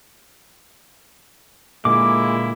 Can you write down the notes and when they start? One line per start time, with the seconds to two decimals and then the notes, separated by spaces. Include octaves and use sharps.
1.85 A#2 D3 G#3 A#3 E4 D6